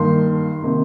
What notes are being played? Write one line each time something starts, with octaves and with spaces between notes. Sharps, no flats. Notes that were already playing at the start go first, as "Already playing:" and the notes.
Already playing: G2 D#3 A#3 C6
C3 D#3 A#3